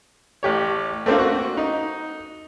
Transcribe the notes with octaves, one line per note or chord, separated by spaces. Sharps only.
A1 G4 C#5
A3 A#3 C4 D4 F4
F#4 C#6
D#4